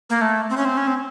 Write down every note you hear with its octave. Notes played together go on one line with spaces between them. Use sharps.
A#3
A3
C4
C#4
C4
C#4
C4